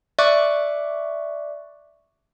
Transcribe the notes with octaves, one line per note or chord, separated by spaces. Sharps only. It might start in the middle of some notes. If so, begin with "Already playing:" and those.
D5 E5 C#6 D6 F#6